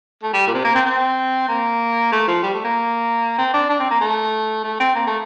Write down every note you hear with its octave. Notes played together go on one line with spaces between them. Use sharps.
A3
G3
A#2
C3
A#3
C4
C4
A#3
A3
F3
G3
A3
A#3
C4
D4
D4
C4
A#3
A3
A3
C4
A#3
A3